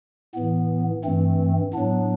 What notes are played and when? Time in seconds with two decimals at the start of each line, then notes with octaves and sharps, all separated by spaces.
0.35 A2 E3 B3
1.04 G2 E3 A3 C4
1.74 A2 F#3 B3 D4